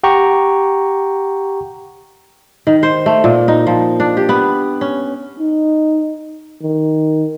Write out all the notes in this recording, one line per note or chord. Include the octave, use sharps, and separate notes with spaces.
G4 F#5 G5 A#5 C#6
D#3
C5
A3
A#2
D#4
F3
D4
G4
B3
C#4
D#4
D#3